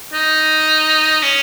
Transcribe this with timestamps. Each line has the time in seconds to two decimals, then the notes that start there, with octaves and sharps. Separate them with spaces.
0.13 D#4
1.23 C#4